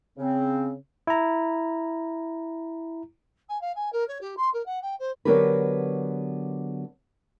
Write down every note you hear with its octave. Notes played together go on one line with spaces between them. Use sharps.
C#3 C4
E4 A#5
G#5
F5
G#5
A#4
C#5
G4
C6
A#4
F#5
G5
C5
D3 F#3 B3 G4 A#4 B4